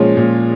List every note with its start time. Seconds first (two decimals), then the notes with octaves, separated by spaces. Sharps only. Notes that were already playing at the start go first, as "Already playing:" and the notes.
Already playing: A#2 F3 G#3 C#4 F4
0.17 A#2